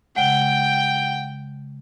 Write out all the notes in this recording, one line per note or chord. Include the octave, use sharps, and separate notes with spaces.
C#3 G#3 F#5 G5 D7 G7